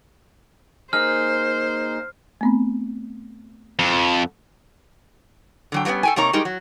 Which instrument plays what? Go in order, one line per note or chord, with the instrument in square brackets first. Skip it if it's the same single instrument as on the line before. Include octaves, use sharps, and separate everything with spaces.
[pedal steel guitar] A#3 D#4 G#4 [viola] C5 [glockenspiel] F6
[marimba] A3 B3 C4
[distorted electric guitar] F2
[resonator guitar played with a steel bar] D3 F#3 G5
F#3 G3 A#3 B3 C#4
A4 G5 G#5
C3 A#3 D#4 C#5 A#5
G3 G#3 D#4 G4 A#4
F#3